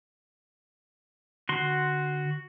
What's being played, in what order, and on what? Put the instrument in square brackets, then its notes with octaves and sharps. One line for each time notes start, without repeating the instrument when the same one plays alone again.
[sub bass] D3 [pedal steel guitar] F#4 C6